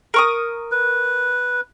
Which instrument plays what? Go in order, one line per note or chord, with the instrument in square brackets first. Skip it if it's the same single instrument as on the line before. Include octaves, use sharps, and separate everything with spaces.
[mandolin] A#4 C#6 D#6
[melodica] B4